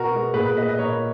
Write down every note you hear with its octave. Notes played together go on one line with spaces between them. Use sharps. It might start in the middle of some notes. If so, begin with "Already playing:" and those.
Already playing: B2 F#4 A#4
G#3 B3
A#2 G#4 B4
A#3 B4 D#5
D#5
A#2 A#4 C#5